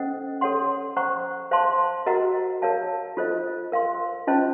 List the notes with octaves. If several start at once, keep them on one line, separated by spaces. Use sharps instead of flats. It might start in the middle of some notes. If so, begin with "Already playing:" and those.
Already playing: C#4 A4 C5 D#5 F#5
A4 C#5 F#5 C6
C5 F#5 A#5 C#6
C5 F5 A5 C6
F#4 A#4 D#5 F#5 A#5
A#4 C#5 F5 A5
F4 A4 C5 D#5
A#4 F5 C6
C#4 F4 C5 D#5 A5